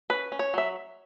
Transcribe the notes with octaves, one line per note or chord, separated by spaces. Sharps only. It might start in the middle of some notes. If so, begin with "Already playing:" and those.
C#4 B4
C#4
C#5
F#3 E5